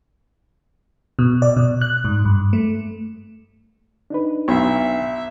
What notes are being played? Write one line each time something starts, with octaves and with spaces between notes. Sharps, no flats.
B2
D5
B2
F#6
G#2
G2
A3
D4 D#4 B4
B1 E5